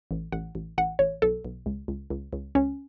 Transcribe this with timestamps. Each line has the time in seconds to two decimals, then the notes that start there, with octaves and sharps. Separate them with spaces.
0.11 A1
0.32 A1 F#5
0.55 A1
0.78 A1 F#5
0.99 A1 C#5
1.22 B1 A4
1.45 B1
1.66 C#2
1.88 C#2
2.10 C#2
2.33 C#2
2.55 C#2 C#4